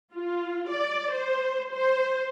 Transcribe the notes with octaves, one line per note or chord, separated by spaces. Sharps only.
F4
D5
C5
C5